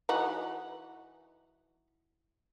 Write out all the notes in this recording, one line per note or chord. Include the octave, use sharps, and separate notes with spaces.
E3 D#4 F#4